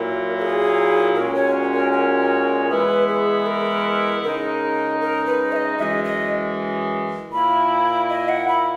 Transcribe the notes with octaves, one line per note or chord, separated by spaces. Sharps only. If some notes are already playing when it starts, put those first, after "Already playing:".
Already playing: A#2 F#3 A#3 E4 A#4
A#4
G#4
A#2 G#3 C#4 F#4 A#4
C#5
A#4
A#4
E3 G#3 B3 E4 B4
G#4
A#4
C#3 G#3 D#4 A#4
A#4
B4
E5
D#5
F#2 E3 G#3 D#5 E5
D#5
A#2 A#3 E4 B5
D#5
F#5
B5